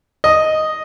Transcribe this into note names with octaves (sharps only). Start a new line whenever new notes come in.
D#5